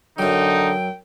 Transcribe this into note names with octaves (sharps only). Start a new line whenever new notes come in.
F#2 D3 F#3 D#4 G5